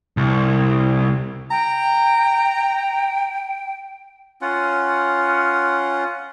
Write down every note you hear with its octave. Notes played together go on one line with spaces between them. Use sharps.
C2
G5 A#5
C#4 F4 F#5